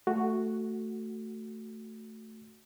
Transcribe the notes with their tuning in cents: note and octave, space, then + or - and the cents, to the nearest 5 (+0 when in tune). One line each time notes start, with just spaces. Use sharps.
A3 +5 F#4 +0